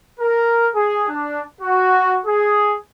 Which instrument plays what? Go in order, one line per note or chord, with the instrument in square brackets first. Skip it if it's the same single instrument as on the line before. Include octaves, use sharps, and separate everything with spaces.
[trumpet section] A#4
G#4
D4
F#4
G#4